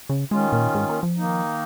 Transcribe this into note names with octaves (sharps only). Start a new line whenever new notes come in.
C#3
D#3 G#3 C#4 F4
A#2
G#2
A#3
F3
D#3 A#3 D#4